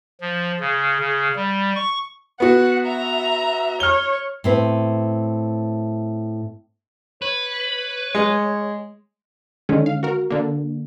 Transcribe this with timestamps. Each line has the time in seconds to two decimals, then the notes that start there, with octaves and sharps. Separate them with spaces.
0.21 F3
0.60 C#3
1.00 C#3
1.36 G3
1.75 C#6
2.40 B3 F#4 F#5
2.86 E5 A#5
3.80 C#5 F6 G7
4.44 A2 C4 B4
7.22 B4 C#5
8.15 G#3
9.69 D3 D#3 G#3 C#4
9.86 F5
10.03 F#4 A#4
10.30 D3 A#3